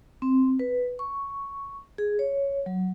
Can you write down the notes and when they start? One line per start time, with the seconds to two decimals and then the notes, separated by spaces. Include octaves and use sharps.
0.22 C4
0.59 B4
0.99 C#6
1.98 G#4
2.19 C#5
2.66 F#3